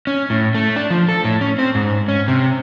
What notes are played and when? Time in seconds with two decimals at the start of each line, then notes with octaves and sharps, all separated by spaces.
0.07 C#4
0.30 A2
0.55 A3
0.76 D4
0.90 F3
1.08 A4
1.25 A2
1.41 C#4
1.59 C4
1.75 G#2
2.08 C#4
2.28 C3